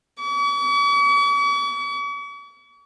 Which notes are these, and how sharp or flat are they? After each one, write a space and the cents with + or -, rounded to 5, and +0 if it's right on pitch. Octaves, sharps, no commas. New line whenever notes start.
C#6 +45